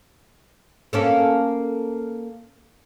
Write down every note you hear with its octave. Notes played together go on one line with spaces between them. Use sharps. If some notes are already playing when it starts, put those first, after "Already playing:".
A#3 C#4 A4